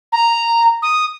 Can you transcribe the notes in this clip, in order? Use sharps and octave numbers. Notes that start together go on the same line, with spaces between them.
A#5
D#6